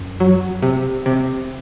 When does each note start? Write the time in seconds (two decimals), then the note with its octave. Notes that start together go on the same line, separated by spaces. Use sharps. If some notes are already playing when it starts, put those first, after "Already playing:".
Already playing: F#2
0.20 F#3
0.62 C3
1.06 C3